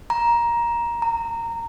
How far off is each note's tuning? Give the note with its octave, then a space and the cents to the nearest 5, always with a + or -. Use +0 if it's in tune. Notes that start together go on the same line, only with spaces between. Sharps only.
A#5 +15
A#5 -15